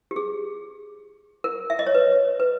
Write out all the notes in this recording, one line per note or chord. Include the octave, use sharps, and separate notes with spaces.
G4
G#4
A#4
E5
D#5
C#5
B4
B4